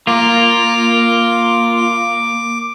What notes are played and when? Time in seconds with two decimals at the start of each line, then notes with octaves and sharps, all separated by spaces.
0.07 A#3 F4 D6